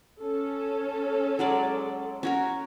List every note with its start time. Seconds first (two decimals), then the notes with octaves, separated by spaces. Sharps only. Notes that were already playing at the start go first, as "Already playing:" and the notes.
0.20 C#4 A4
1.39 F#3 G#3 D5
2.23 C#4 F#4 A#4